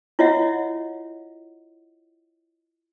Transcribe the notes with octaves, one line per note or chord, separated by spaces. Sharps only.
E4 F4 C#5 D#5 E5 F#5